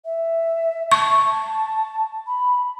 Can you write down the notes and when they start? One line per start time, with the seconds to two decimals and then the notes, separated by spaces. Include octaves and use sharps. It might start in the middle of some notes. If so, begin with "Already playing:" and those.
0.05 E5
0.92 A5 C#6
2.27 B5